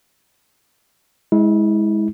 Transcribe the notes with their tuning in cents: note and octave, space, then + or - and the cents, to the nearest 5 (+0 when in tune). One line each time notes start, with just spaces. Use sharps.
G#3 +0 E4 -30